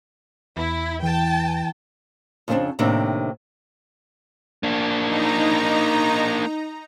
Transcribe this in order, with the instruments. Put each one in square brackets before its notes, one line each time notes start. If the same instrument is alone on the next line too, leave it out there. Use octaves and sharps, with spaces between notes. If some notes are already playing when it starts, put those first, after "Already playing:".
[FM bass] E2 [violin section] E4
[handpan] E3 [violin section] G5 A5
[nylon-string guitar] F2 C#3 A3 B3 C4 D4
A2 C3 D#3 A#3 C4 D4
[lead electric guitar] A#3 D4
[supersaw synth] D#4 A#5